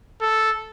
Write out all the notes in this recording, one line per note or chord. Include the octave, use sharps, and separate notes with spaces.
A4